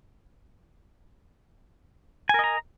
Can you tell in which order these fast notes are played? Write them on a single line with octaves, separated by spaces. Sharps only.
G#5 A#4 D#5 A#5